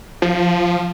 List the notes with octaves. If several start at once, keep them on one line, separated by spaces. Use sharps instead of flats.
F3